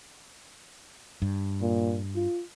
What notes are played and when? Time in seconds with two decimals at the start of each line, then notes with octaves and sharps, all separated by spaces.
1.22 G2
1.62 A#2
2.15 F4